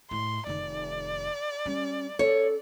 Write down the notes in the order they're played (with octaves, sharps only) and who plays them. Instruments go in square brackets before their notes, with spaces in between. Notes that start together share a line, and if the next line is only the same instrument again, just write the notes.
[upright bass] A2 [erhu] C6
[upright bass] F1 D#3 [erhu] D5
[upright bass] G3 [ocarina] C#4
[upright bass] C#4 [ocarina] A4 [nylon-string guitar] C#5